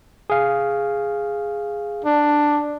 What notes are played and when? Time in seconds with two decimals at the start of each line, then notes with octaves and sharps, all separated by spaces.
0.30 G#4 F5
2.04 D4